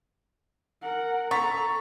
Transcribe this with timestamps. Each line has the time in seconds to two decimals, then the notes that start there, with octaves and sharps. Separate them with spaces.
0.82 A#4 F#5
1.31 A4 A#5 C#6 A6 B6